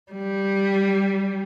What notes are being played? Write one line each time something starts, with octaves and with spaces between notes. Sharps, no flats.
G3